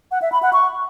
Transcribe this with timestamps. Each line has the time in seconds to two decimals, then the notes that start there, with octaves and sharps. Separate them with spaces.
0.11 F#5
0.22 E5
0.32 B5
0.43 F#5
0.53 C#6